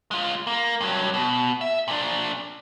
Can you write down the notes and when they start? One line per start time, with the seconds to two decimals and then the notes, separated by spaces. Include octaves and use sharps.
0.11 G#3 F4
0.47 A#3
0.81 G2 F#3
1.14 B2
1.61 E5
1.88 A#2 D4